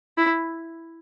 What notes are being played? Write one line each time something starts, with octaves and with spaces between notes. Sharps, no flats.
E4